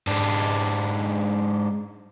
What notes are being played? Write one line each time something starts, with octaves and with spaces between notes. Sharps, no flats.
G#2 D4